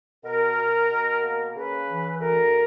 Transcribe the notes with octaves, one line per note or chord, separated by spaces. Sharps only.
B2 A#4
B2
B2
A#3
C#3 B4
E3
D2 A#4